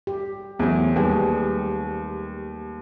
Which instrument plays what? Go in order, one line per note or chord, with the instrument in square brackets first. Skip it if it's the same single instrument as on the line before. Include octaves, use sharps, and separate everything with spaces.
[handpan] G4
[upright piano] E2 [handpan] F#3 A3 C4
[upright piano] D#2 [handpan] G3 G#4 B4